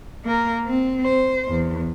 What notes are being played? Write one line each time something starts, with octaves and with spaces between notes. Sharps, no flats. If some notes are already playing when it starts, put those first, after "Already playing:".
A#3 A#4
C4
C5
E2